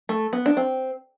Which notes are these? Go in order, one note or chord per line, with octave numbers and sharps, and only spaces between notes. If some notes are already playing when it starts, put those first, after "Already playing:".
A3
B3
D4
C4